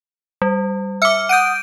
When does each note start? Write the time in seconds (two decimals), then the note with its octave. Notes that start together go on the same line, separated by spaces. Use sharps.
0.42 G3
1.02 E5 D6 F6 C#7
1.29 F#5 D#6 G6 D7 D#7